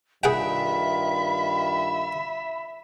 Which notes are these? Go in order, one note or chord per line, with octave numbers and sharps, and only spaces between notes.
G2 D#3 F4 G#4 E5 F#5 G5 B5